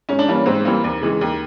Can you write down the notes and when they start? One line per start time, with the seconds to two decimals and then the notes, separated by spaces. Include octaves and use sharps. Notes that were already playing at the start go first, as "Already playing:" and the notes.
0.09 G#2 C#4
0.19 D4
0.28 E3 G3 A#3 C#4
0.46 G#2 C4
0.65 E3 G3 A#3 C4
0.84 D#2
1.02 C#3 E3 G#3
1.21 D#2